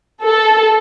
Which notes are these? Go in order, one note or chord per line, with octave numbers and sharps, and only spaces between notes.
A4